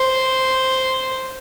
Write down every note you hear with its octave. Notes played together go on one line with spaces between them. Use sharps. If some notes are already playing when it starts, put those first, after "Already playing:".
Already playing: C5